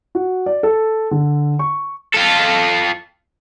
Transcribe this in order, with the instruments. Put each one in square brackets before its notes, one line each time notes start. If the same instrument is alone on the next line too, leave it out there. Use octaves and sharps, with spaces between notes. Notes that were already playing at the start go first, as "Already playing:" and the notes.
[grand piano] F#4
D5
A4
D3
C#6
[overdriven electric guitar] F4 A4